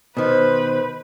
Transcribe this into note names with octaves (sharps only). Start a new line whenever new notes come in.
B2 D#3 B4 C5